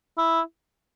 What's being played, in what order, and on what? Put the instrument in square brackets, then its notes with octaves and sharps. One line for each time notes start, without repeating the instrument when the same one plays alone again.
[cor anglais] E4